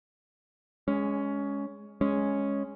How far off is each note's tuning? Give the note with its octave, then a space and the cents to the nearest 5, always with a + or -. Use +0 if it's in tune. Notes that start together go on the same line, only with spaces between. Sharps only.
G#3 +0 C#4 +15
G#3 +0 C#4 +0